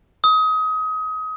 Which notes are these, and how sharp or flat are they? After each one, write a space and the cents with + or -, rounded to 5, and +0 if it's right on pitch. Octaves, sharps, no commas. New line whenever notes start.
D#6 +25